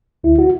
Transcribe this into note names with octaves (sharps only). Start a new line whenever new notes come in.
D2 E4
F#4